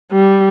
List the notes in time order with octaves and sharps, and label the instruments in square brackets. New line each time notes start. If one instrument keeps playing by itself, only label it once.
[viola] G3